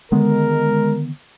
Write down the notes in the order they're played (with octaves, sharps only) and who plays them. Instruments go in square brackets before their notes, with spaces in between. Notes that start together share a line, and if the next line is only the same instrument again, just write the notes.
[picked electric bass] D3 D#3 B3 [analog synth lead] G#3 [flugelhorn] A#4